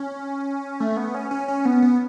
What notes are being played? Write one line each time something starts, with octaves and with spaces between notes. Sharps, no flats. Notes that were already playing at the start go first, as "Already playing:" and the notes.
Already playing: C#4
A3
B3
C#4
C#4
C#4
B3
B3